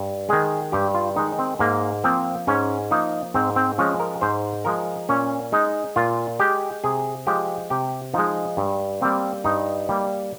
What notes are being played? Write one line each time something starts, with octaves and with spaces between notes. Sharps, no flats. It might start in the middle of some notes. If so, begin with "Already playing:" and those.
Already playing: G2
D#3 G#3 G#4
G2 G4
F4
D#3 G#3 D#4
C4
G#2 A#3
F3 A#3 C4
G#2 C#4
F3 A#3 D#4
G#2 C4
C4
F3 G#3 C#4
A#4
G#2 C5
F3 G#3 A#4
A#2 C#4
G#3 D#4
A#2 F4
G#3 G4
C3 G#4
F3 G#3 G4
C3 G4
F3 G#3 D#4
G2
G3 A#3 C4
G2 D#4
G3 A#3